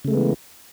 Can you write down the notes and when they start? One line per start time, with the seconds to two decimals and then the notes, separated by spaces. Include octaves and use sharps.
0.05 C#3
0.08 A3
0.11 G#3
0.14 B3
0.17 E3